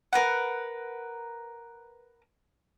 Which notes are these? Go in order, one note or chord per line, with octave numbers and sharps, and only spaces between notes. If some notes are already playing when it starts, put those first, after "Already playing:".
A#4 B4 F#5